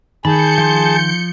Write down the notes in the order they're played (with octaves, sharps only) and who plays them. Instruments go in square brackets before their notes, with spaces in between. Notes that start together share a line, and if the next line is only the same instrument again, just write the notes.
[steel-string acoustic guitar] D#3 [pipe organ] G#4 A5 [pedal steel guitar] B5 [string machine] G6 C#7
[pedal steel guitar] F3 C6